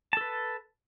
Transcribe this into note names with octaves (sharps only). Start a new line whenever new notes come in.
A4 B4 A5